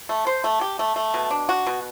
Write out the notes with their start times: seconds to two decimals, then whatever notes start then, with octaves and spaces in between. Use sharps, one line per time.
0.09 A3
0.27 C5
0.44 A3
0.61 G4
0.79 A3
0.96 A3
1.14 B2
1.31 D4
1.49 F#4
1.67 B2